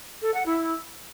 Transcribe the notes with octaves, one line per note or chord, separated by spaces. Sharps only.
A4
F#5
E4